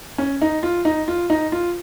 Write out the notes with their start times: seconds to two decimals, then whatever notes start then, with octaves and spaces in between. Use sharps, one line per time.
0.18 C#4
0.42 D#4
0.63 F4
0.85 D#4
1.08 F4
1.30 D#4
1.52 F4